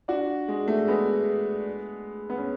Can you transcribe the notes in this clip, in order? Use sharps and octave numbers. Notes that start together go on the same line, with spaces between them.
D4 F#4
G#3
A3
G#3 B3
B3
C#4